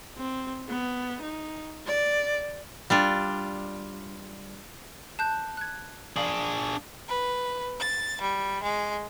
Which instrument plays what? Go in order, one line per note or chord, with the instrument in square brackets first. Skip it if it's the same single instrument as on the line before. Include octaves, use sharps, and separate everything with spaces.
[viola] C4
B3
D#4
D5
[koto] G3 D4 F4
[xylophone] A5 F#6 G6
F#6 G#6
[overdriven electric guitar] D4 G#4 [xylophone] D5 F5 F#7
[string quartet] B4
A6
G3
G#3